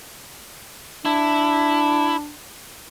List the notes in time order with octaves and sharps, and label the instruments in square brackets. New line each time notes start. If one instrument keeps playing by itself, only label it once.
[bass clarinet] D4 [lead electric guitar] E4